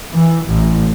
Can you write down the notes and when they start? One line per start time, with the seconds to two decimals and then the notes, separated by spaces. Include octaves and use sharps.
0.12 E3
0.46 A1